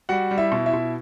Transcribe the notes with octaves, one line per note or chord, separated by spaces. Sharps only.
G3 F#4 F#5
G3
E4 E5
B2
E4 E5
B2